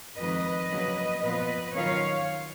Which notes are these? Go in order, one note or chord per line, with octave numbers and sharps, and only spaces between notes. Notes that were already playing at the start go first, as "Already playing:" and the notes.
F2 D#3 G#3 B4 D#5
C#3 F#3 A#3
A#2 F3 B3 F4 B4 D#5
D#3 F#3 C#4 F4 C#5 F5